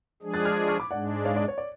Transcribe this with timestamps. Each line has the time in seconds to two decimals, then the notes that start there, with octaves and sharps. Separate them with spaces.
0.22 F3 G#3 D4 G#4
0.34 F#6 A6
0.45 F6 G#6
0.68 C#6 F6
0.80 B5 D6
0.90 G#2 G#3 D4 D5 F#5
1.25 C#5 F5
1.36 D5
1.48 C#5
1.58 D5